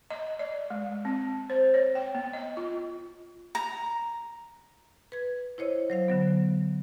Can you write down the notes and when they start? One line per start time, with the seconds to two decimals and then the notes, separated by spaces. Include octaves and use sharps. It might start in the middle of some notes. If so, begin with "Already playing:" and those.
0.10 D#5
0.39 D5
0.70 G#3
1.05 C4
1.50 C5
1.74 C#5
1.95 G5
2.15 B3
2.33 D#5
2.57 F4
3.55 A#5
5.12 B4 G#6
5.58 E4 C5 C#5 D#5
5.90 F#3 C5 F5
6.08 D3 F#3 B3